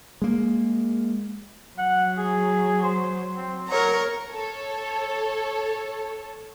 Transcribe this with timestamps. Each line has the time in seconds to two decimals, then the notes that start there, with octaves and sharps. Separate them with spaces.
0.22 G#3 A#3
1.78 F#3 F#5
2.18 G#4
2.83 C5
3.37 C4
3.69 F#3 A#4 C#5 A#5
4.30 A4 C#5